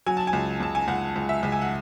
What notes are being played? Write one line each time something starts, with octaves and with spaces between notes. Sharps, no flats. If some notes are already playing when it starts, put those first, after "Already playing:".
F#3 G#5
A5
G#5
C#2
C#2 A5
G#5
C#2 F#5
C#2
E5
C#2
G#5
F#5